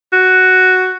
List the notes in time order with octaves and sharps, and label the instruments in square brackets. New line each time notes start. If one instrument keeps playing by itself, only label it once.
[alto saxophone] F#4